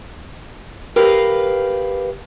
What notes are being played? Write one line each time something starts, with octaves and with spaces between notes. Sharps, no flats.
G4 A#4 B4 F5